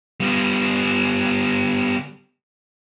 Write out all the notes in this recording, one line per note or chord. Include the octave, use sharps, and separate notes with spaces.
G3 B3